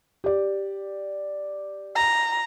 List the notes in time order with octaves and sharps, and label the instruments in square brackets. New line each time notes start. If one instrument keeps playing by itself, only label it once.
[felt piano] G4 D5
[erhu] A#5